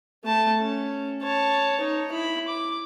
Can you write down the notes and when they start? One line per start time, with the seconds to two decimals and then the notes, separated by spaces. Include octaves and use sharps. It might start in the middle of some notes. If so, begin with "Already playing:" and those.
0.24 A3 A5
0.60 C#4
1.22 C#5 A5
1.80 D#4 C#5
2.11 E4 B5
2.48 D6